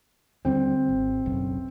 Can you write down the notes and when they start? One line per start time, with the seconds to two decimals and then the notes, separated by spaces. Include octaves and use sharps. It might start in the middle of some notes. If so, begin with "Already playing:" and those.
0.45 D#2 D3 G3 C4
0.89 G#1
1.26 F#1 B1 F#2